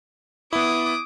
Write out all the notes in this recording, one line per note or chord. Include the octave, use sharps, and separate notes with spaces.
B3 E4 D6 D#6